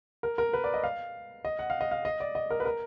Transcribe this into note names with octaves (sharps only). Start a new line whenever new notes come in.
A#4
A#4
B4
D5
D#5
F5
D#5
F#5
F5
D#5
F5
D#5
D5
D#5
A#4
B4
A#4